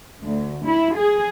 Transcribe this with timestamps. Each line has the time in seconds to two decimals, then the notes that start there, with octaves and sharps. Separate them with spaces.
0.23 D2
0.65 E4
0.96 G#4